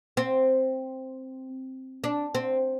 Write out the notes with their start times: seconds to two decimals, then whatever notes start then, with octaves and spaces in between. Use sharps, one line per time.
0.17 C4
2.04 D4
2.35 C4